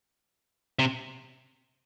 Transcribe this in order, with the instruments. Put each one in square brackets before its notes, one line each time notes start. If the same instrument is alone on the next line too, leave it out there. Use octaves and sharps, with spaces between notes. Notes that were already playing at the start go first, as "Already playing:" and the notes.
[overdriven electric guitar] C3